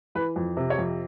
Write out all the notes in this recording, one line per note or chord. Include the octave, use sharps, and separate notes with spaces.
E3 B4
F2
C3
C#5
F2